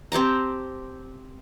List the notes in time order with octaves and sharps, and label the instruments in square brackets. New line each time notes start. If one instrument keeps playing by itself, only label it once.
[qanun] C4 G4 A5 A#5